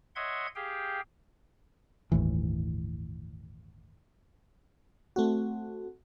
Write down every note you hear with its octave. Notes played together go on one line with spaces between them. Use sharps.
C#5 D#5 E5 F#5 C6 G#6
G4 G#4 F5 G5
G1 D#2 A2 E3
A3 C4 F#4